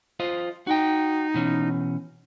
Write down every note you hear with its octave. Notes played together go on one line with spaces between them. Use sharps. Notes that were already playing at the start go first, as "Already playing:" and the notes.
F4 C5 D#5
D#4 F#4 G5
B2 E3 C#4